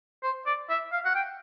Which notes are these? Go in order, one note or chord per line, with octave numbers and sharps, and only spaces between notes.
C5
D5
E5
F5
F#5
G5